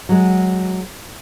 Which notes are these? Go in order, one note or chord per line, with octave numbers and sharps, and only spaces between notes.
F#3 G#3